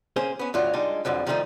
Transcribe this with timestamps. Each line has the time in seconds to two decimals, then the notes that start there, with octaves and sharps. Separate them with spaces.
0.16 A#3 C#4 G#4 C5
0.39 B3 C#4
0.54 D2 G2 F#3 F4
0.74 G3 G#3 D4 D#4 F4
1.05 C2 F2 D3 F3 F#3
1.27 D#3 F3 G3 A3 B3 D#4